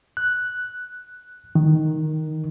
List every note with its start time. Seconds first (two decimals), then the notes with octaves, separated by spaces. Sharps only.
0.17 F#6
1.55 D#3